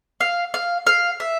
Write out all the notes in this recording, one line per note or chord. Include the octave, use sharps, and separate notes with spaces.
F5
F5
F5
E5